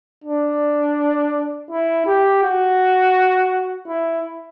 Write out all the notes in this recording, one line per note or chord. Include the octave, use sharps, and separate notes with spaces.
D4
E4
G4
F#4
E4